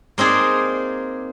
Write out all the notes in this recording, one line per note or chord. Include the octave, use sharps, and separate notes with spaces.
A#3 C4 D#4 G#4 D5